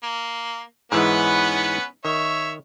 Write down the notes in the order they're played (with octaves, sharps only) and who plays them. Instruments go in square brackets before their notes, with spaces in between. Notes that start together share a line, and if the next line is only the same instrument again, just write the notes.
[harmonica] A#3
[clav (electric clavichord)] G#2 E3 G#3 [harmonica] B3 C#4 B4
[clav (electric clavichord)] D#3 [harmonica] C#5 E5